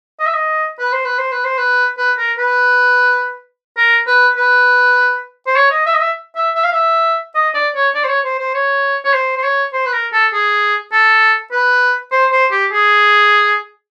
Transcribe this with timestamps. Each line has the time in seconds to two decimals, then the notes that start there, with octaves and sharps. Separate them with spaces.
0.20 D#5
0.26 E5
0.34 D#5
0.79 B4
0.93 C5
1.05 B4
1.18 C5
1.32 B4
1.45 C5
1.58 B4
1.98 B4
2.18 A#4
2.38 B4
3.77 A#4
4.07 B4
4.37 B4
5.47 C5
5.56 C#5
5.71 D#5
5.86 E5
5.94 D#5
6.01 E5
6.36 E5
6.55 E5
6.64 F5
6.72 E5
7.35 D#5
7.54 D5
7.75 C#5
7.95 D5
8.04 C5
8.09 C#5
8.25 C5
8.39 C5
8.54 C#5
9.05 C#5
9.14 C5
9.37 C5
9.44 C#5
9.73 C5
9.86 B4
9.93 A#4
10.13 A4
10.33 G#4
10.92 A4
11.52 B4
12.12 C5
12.32 C5
12.51 G4
12.72 G#4